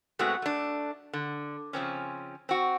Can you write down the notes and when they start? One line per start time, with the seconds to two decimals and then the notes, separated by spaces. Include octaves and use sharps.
0.19 B2 G#3 A3 B3 C4 F#4
0.42 A3 D4
1.13 D3
1.73 C#3 F3 C4 C#4
2.49 C4 F#4